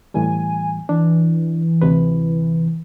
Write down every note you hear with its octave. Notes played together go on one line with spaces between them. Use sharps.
A2 E3 G3 G#5
E3 D4
D2 C3 B4